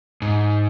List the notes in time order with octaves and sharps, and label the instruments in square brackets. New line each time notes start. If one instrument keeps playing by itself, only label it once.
[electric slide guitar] G#2